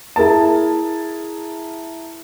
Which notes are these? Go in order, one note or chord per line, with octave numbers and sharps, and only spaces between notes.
E4 G#4 A#4 A5